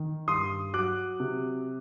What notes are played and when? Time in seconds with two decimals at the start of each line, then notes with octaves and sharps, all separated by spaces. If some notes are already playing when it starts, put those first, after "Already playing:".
Already playing: D#3
0.27 G2 C6 D#6
0.74 F#3 D6 F#6
1.20 C3